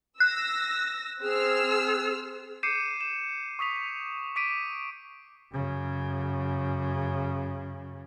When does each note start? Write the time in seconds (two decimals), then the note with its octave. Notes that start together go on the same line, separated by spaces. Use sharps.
0.20 E6 F#6 A#6
1.21 C4 G#4 E6 F6
2.63 D6 G6 C7 C#7 D#7 E7
3.01 E7
3.59 C#6 D#6 B6 F7
4.36 D6 B6 D7 D#7
5.52 F#2 C#3